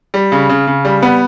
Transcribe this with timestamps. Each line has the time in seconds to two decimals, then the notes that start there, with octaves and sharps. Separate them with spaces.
0.14 G3
0.32 C#3
0.49 C#3
0.67 C#3
0.85 G3
1.03 B3